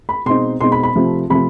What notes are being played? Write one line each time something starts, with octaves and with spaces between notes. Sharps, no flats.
B5
B2 G#3 C4 D#4 C6
B2 G#3 C4 D#4 C6
B5
B5
C3 F3 A3
C3 F3 A3 B5